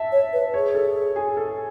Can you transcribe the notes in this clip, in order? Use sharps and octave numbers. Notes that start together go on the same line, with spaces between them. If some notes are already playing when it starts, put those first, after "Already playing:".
Already playing: E5 A5
C#5
B4
G#4 C#5
A4
G#4
A4